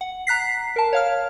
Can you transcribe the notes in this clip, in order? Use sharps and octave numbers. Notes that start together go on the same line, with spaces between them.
F#5
A#5 F#6 B6 C7
A#4 A5
C#5 F5 F6